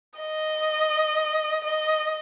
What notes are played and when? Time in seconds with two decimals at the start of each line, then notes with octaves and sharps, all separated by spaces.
0.19 D#5
1.64 D#5